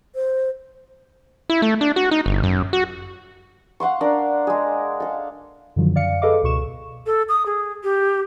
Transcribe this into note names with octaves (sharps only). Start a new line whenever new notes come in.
C5
E4
A3
D4
F#4
D#4
G1
F#2
F#4
F5 F#5 C6 C#6
D4 A#4
G#3 G#4
A4 F5
F#2 D3 D#3 F3 F#3
F#2 D5 F5 C#7
G#4 A4 B4 D#5 F5 D6
C#2 B2 C#6 E7
A4
D#6
G#4
G4